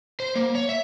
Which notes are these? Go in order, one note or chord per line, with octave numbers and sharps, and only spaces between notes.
C5
A#3
C#5
E5